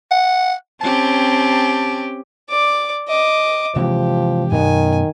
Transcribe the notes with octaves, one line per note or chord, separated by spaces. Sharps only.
F#5
C4 C#4 G4 A5
D5 D6
D#5 D6
C3 E3 F3 G#3 G4
F#2 B2 D#3 B3 G#5